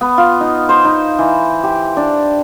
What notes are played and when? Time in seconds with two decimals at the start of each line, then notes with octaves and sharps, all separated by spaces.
0.01 B3
0.18 F4
0.41 D#4
0.69 C5
0.85 D#4
1.19 E3
1.63 G4
1.97 D4